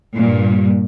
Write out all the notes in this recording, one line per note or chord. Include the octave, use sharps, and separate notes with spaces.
G2 A#2